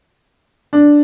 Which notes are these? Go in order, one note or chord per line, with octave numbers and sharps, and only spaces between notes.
D4